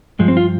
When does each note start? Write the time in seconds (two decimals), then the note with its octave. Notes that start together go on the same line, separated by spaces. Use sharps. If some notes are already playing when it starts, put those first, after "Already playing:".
0.19 G2 F3 G#3
0.28 C4
0.37 F4